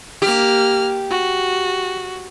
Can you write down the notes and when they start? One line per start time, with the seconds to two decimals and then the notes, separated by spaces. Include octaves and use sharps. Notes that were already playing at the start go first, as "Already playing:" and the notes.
0.22 A#3 G4 F6
1.10 F#4